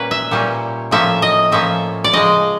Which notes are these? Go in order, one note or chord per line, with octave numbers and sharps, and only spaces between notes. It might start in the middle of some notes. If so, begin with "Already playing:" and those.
Already playing: A#2 G3 A#3 C#4 B4
E5
A#2 G3 A#3 C#4
A2 F3 A#3 C#4 E5
D#5
A2 F3 A#3 C#4 E5
D5
C#3 F3 G#3 D#5